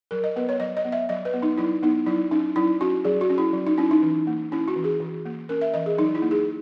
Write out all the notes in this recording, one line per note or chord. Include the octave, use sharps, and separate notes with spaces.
F#3 A#4
D#5
B3 B4
C#5
F#3 D#5
D#5
B3
E5
F#3 D#5
B4
B3
D#4
F#3 E4
B3 D#4
F#3 E4
C#4 D#4
F#3 E4
C#4 F#4
F#3 G#4
F#4
C#4
E4
F#3
D#4
C#4 E4
D#4
E3
A#3
C#4 E4
F#4
E3
G#4
E3
A#3
C#4 A#4
E5
E3 D#5
G#4
F#3 D#4
E4
A#3
G#4